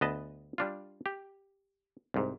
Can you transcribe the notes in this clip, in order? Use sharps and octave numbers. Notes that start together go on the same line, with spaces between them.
D2 B3 B4 D#5 A5
G3 D4 F4
G4
C2 G#2